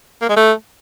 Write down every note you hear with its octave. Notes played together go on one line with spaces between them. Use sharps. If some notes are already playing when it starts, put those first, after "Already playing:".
A#3
G#3
A3